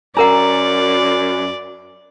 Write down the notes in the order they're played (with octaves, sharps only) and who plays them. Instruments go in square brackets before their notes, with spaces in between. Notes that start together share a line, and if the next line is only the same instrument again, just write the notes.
[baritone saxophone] F#2 [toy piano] D4 A#4 F#5 [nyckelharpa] D5 [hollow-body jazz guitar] A#5